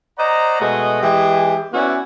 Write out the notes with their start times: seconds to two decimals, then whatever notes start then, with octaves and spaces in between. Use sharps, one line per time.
0.19 C5 D5 D#5 F#5 A#5
0.60 B2 G#3 A3 F#4 G#4 D#5
1.02 E3 G#3 G4 G#4
1.73 B3 C#4 E4 F#4 D5 G#5